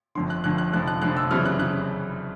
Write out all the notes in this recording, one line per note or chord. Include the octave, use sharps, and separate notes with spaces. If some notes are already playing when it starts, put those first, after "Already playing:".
G1 F2 D3 C6
F#6
G1 F2 D3 F#6
F#6
F1 F2 D3 F3 F#6
F#6
F1 F2 D3 F3 F#6
E6
F#2 C#3 E3 G3 C4 F6
F#6
C#3 F#6